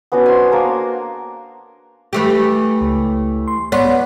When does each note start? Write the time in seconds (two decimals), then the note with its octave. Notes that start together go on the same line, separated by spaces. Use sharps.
0.12 B3 C#4 D4 F#4
0.26 C5 G#5
0.52 A#3 A#4 A5
2.13 E3 A3 G4
2.81 C#2
3.48 C6
3.72 B3 C#5 D5 C6